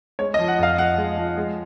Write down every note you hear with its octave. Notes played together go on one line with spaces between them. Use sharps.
G#3 C#5
D#5
F3
F#5
F2 F5
F2 F#5
G#3
F3
G#3